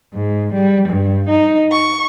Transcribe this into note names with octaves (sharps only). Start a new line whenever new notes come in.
G#2
G3
G2
D#4
C#6